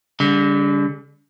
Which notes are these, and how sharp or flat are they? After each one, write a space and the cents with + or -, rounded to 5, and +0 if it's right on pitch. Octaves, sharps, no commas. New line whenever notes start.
D3 -40 G3 +25